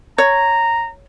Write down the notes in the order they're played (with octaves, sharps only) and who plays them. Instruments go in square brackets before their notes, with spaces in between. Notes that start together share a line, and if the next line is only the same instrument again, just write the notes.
[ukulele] C#5 [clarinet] A#5